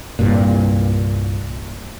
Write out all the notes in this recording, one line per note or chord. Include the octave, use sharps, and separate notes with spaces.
C2 G2 A#2